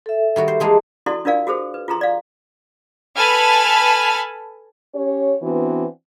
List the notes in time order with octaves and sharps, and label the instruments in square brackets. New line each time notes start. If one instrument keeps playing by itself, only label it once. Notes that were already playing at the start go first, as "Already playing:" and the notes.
[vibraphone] A4 E5
[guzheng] D#3 G3 F#4
C5
[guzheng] E3 G#3 A#3 [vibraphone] D#5 A5
[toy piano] E4 F#4 A4 D5 A5 C6
D4 F4 A#4 D5 F5 G#5
F#4 G#4 A4 C5
B4
F4 G#4 A4 A#5 C6
D5 F5
[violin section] A4 B4 G#5 A5 B5 F6
[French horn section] C#4 G4 C#5
E3 B3 C4 D4 F#4